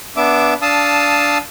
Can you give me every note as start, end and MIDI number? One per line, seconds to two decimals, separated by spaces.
0.17 0.54 59
0.17 0.54 62
0.17 0.54 76
0.17 0.54 86
0.62 1.38 62
0.62 1.38 77
0.62 1.38 81
0.62 1.38 87
0.62 1.38 88